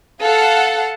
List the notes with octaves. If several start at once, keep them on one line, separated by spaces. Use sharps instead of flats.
A4 F5 F#5 A5